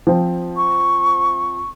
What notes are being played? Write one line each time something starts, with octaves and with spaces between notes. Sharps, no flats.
F3 C4
C#6